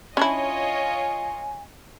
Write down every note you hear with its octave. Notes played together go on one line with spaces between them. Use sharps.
C#4 D4 E4 F4 C#5 D#5 G#5